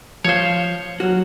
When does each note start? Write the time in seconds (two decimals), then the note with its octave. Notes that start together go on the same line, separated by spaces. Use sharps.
0.25 F3 C5 C#5 F5
1.00 F#3 F#4 F6